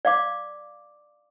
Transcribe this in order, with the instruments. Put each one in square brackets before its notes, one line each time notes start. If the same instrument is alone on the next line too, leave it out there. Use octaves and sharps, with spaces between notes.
[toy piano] D5 F5 D6